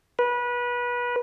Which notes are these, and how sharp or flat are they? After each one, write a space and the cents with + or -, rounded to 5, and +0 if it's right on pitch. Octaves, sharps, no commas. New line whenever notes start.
B4 -25